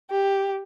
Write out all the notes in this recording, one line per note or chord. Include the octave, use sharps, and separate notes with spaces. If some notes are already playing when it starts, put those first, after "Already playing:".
G4